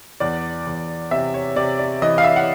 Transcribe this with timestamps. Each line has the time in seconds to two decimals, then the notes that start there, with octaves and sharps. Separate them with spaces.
0.20 E2 D5
0.67 E2
1.11 C3 E5
1.34 C#5
1.56 C3 D5
1.79 D5
2.02 E3 D#5
2.18 F5
2.24 E5
2.36 F#5